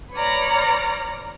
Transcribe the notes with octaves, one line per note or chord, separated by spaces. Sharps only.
B4 C#5 D5 A#5 F6